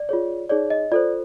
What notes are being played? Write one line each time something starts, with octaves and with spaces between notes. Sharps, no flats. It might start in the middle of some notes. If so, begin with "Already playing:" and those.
Already playing: D5
F4 G#4 C#5
D#4 G#4 C#5 D5
D#5
F4 A4 C5 D5